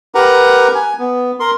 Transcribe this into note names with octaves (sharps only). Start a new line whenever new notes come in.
G4 A#4 B4 F#5 A#5
G#5
B3
A#4 C6